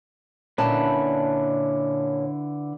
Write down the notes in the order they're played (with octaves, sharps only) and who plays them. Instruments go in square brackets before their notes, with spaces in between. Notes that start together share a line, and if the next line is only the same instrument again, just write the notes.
[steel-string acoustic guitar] A#2 C#4 A5 [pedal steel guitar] D3 E4 B4